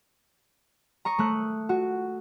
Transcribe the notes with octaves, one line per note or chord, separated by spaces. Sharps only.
A#5 C#6 D#6
A3 F#6
F#4